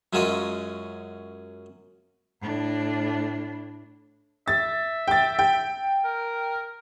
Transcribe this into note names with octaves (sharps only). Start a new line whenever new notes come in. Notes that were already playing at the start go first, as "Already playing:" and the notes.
F#2 F#3 G#3 C#4 F4 D#5
A2 D4
E5 A6
G5 A6
G5
A#4